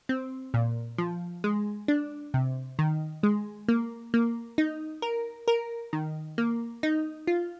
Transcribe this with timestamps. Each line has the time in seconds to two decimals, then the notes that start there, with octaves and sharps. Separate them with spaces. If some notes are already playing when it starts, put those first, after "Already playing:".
0.09 C4
0.54 A#2
0.98 F3
1.44 G#3
1.88 D4
2.34 C3
2.79 D#3
3.23 G#3
3.68 A#3
4.14 A#3
4.58 D#4
5.02 A#4
5.48 A#4
5.93 D#3
6.38 A#3
6.83 D#4
7.27 F4